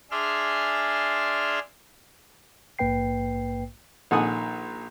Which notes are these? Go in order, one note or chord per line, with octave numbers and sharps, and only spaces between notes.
D4 G#4 D5 E5 C6 F6
A#1 G#2 A#3 B4 G5 C7
A#1 D#3 A4 F#5 G#5 D#6